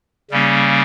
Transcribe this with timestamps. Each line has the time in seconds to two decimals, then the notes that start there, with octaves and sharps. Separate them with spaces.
0.31 C#3 G3 A#3 C#4